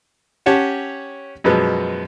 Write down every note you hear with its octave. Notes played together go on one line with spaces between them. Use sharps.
C#4 G4 C#5 F#5 A5
F#2 B2 F3 G#3 B3